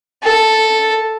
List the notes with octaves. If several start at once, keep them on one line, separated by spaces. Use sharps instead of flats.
A4